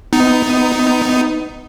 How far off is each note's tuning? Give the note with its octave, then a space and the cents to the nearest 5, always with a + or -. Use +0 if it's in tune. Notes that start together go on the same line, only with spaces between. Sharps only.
B3 +25 D#4 +0